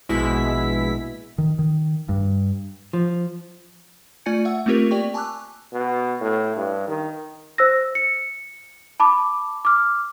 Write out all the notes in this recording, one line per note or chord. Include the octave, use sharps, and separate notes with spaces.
A#1 B2 G#3 E4 B6
D#3
D#3
G2
F3
A3 F4 D5 G#5 G#6 C#7
E5 F#5 E6
A3 A#3 C4 F4 G4 A#4
G4 D5 G5 C#6
G#5 A5 C#6 D6 E6 F#6
B2
A2
G2
D#3
C5 E6 A#6
C#7
A5 B5 D6
D6 F6